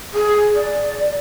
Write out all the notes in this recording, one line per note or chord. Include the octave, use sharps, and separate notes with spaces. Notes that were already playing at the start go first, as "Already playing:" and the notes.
G#4
D5